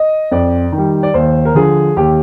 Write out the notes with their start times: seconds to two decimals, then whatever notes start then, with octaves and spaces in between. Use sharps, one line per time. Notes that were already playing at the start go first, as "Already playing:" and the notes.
Already playing: D#5
0.31 F2 D5
0.72 D#3
0.78 G3
1.03 D5
1.14 D#2 C5
1.45 A#4
1.55 D3 F3 G#4
1.97 D#2 G4